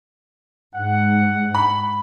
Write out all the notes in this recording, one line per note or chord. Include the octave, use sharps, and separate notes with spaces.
G#2 F#5
B5